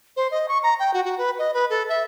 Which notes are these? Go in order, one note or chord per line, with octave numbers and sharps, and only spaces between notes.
C5
D#5
C#6
A#5
G5
F#4
F#4
B4
D#5
B4
A4
E5